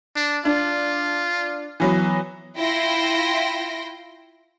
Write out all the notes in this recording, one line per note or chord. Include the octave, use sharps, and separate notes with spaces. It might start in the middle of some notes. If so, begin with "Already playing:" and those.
D4
D4 F4
E3 F#3 B3
E4 F4 G5 C6 A#6